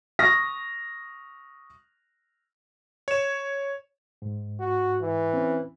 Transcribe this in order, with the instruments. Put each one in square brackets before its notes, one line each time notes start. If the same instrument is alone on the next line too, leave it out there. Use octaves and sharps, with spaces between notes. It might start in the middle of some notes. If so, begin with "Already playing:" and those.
[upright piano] C#6 D#6 F6 A#6
[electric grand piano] C#5 E7
[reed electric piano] G#2
[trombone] F#4
E3
[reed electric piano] C4 C#4